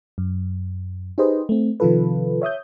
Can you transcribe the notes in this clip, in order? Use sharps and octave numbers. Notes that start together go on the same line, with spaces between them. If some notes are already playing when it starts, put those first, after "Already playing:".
F#2
D#4 G4 G#4 B4 C5 D#5
A3 C4
C3 D#3 F3 F4 A4 B4
C#5 E5 D#6 G6